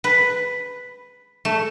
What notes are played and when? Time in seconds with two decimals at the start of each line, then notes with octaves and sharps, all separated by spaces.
0.04 B4
1.45 A3